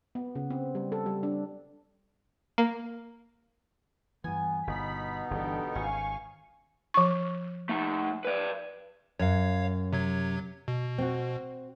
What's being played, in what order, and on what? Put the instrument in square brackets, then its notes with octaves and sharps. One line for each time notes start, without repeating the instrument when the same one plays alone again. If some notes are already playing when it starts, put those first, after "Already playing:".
[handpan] B3
C#3
C4
G3
A4
G3
D4
[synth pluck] A#3
[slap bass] G2 E3 [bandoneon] B3 [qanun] G#5
[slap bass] G1 [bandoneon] B2 B3 D#4 [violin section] B5 B6
[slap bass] G1 E3 [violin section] D4 G4 A4
[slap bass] G#1 [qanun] C#4 [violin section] F5 G#5 C#6
[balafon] F3 C#6
[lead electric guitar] A3 D#4
B4 D5
[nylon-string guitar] F#2 [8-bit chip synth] C#5 F5
[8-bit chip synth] C3 F#3 G#6
B2
[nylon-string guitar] C4 F#4